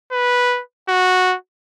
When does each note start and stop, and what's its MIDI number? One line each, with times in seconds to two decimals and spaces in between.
0.12 0.62 71
0.89 1.36 66